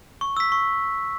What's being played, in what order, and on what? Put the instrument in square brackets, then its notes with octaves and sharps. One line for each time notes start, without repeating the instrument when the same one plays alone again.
[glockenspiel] C#6
E6 B6
C#6